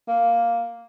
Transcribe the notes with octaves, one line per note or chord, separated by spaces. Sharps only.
A#3